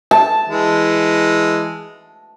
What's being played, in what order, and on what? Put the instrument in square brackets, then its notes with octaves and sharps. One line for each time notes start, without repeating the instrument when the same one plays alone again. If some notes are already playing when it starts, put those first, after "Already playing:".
[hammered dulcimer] A5
[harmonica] E3 G#3